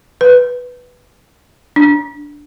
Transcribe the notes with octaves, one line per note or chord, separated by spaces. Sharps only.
B4
D4